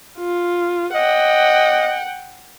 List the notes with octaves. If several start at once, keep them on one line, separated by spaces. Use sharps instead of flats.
F4
D#5 F#5 G5